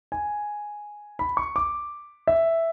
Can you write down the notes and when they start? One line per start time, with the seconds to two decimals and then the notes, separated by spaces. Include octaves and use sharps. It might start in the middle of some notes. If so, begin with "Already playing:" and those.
0.12 G#5
1.19 B5
1.37 C#6
1.56 D6
2.27 E5